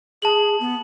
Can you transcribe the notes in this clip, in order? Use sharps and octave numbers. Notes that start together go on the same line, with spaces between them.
G#4 A5 F#7
B3